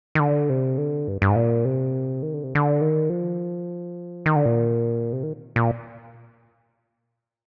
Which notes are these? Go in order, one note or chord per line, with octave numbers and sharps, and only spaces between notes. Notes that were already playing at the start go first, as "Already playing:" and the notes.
D#3
D3
C3
D3
G2
G2
G#2
A#2
C3
D#3
D3
C3
D3
D#3
F3
D#3
D3
A#2
C3
D#3
A#2